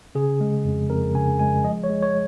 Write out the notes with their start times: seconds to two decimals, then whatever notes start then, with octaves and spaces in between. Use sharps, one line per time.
0.15 C#3 G#4
0.41 G#3
0.65 F2
0.90 F2 A#4
1.15 C#3 G#5
1.39 G#3 G#5
1.64 F3 D#5
1.84 C#5
1.90 G#3
2.03 C#5